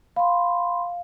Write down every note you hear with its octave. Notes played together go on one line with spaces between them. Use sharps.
F5 B5 C6